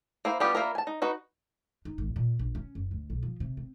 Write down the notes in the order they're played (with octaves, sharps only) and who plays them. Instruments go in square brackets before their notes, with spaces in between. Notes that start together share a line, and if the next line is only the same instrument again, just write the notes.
[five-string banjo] A#3 E4 C5
G3 B3 D4 F4 G4
A#3 D4 E4 F4 A#4
G#5 A5
D#4
D#4 F#4 B4
[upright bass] D#4
A1
A#2
A#1
C#4
F#1
D2
B1
F3
C3
C4